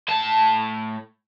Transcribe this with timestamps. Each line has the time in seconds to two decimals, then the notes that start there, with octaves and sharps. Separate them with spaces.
0.09 A2 A5